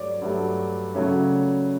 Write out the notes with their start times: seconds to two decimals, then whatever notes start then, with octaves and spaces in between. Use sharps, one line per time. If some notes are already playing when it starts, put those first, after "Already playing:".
Already playing: G2 F#3 A3 C#5 D5
0.22 G2 F#3 A3
0.95 C#3 F#3 A3 C#4